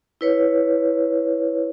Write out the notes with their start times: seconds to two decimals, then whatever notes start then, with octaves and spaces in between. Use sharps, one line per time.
0.21 E4 B4 C#5